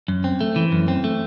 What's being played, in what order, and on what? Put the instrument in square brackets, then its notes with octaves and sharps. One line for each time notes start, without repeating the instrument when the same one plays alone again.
[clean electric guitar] F#2
C4
A3
E3
F#2
C4
A3